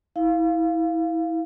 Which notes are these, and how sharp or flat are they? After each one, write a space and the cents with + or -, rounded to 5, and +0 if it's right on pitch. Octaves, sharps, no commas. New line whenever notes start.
E4 -25 F5 +0